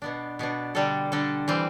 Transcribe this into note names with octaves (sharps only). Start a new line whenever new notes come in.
B2 B3 D4
B2 B3 D4
D3 G3 D4 A4
D3 G3 D4 A4
E3 G3 C4